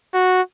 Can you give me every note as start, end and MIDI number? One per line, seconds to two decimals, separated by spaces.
0.14 0.42 66